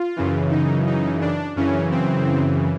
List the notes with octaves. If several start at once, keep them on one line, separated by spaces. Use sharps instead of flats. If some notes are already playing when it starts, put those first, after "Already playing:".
Already playing: F4
F#2 C#3 E3
D#4
D#4
D4
F#2 C#3 E3 C#4
C4